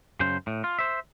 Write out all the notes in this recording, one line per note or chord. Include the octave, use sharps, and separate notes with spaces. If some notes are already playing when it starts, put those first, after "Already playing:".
F#2 C#3 C5
A2
F4
C5 E5